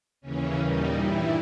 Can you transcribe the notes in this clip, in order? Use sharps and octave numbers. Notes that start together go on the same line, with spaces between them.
D#2 C#3 E3 C#4
A#2 G3 D#4
G2 E3 G3 E4